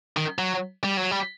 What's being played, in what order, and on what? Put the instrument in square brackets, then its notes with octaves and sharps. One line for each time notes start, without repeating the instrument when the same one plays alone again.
[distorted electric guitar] D#3
F#3
G3
F#3
G3